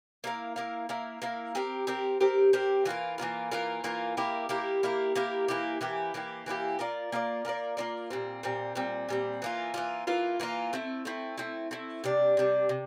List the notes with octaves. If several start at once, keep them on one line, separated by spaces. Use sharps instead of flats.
A#3 E4 A#4 F5
A#3 E4 A#4 F5
A#3 E4 A#4 F5
A#3 E4 A#4 F5
C4 G4 A#4
C4 G4 A#4
C4 G4 A#4
C4 G4 A#4
E3 A#3 F4 A#4
E3 A#3 F4 A#4
E3 A#3 F4 A#4
E3 A#3 F4 A#4
A#3 E4 G4 A#4
A#3 E4 G4 A#4
A#3 E4 G4 A#4
A#3 E4 G4 A#4
E3 A#3 E4 G4
E3 A#3 E4 G4
E3 A#3 E4 G4
E3 A#3 E4 G4
A#3 F4 A#4 D5
A#3 F4 A#4 D5
A#3 F4 A#4 D5
A#3 F4 A#4 D5
A#2 G3 C4
A#2 G3 C4
A#2 G3 C4
A#2 G3 C4
E3 A#3 F4
E3 A#3 F4
E3 A#3 F4
E3 A#3 F4
A3 C4 E4
A3 C4 E4
A3 C4 E4
A3 C4 E4
C3 G3 D4
C3 G3 D4
C3